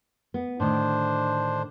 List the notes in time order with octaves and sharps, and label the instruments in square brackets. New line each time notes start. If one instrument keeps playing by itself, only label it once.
[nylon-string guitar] B3
[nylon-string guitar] A2 D3 D#3 [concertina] D4 C5